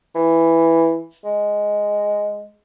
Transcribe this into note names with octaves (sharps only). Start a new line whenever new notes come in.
E3
G#3